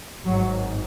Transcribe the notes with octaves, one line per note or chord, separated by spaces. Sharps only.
G#1 G#2 F#3